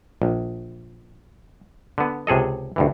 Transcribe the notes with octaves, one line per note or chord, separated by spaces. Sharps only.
A#1
D3 B3
C#2 C3 G#4 A4 D#5
D2 G2 E3